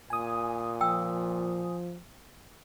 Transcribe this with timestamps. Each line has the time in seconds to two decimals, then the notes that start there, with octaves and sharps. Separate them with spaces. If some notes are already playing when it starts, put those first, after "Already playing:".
0.10 A#2 G#5 D#6
0.81 F3 G5 E6